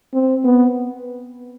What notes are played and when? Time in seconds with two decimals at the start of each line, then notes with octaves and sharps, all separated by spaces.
0.13 C4
0.44 B3